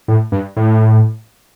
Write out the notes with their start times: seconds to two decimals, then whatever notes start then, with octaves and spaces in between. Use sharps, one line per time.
0.08 A2
0.32 G2
0.57 A2